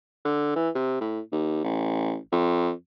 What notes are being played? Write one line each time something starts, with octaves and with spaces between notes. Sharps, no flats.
D3
E3
C3
A2
D#2
A1
F2